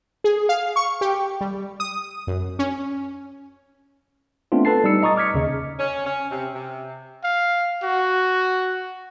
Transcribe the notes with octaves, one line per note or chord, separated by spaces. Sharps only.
G#4
F5
C#6
G4
G3
D#6
F#2
C#4
A3 B3 C4 D4 F4
A4 B4 A5 A6 C7
G3 D#4 E6 C#7
D#5 A#5 C#6 D#6 A6
D6 F6 G#6 B6 C#7
D#2 C#3 D#5
C#4
C#4
C3
C3
F5
F#4